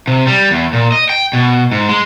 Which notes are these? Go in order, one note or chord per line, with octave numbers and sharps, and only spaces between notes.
C3
G3
E2
A#2
D#5
G5
B2
G#2
G#3